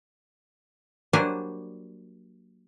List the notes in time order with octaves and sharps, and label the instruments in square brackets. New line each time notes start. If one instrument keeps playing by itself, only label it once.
[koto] F#3 G3 A#3 D4 C5 G#5